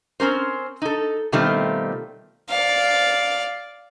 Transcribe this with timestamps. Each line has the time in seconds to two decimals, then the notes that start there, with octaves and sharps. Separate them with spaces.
0.20 C4 C#4 A#4 C5
0.82 D#4 A4
1.32 B2 D#3 G3 A3 C4 F4
2.50 D5 F5